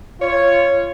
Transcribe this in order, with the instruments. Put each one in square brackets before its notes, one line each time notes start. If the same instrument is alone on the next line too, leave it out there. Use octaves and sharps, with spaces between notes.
[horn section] F4 C#5